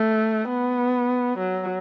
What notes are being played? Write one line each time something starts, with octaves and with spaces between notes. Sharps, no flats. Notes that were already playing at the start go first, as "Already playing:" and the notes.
Already playing: A3
B3
F#3